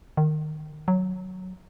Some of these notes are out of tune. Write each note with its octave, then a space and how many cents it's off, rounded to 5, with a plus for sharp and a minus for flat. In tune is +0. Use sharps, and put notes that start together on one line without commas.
D#3 -20
F#3 +0